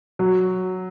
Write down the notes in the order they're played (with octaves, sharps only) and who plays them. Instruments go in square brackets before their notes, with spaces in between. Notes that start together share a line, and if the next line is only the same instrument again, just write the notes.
[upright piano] F#3